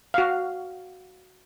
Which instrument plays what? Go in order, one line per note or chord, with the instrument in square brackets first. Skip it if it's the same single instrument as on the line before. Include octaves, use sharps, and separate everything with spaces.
[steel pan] F#4 F5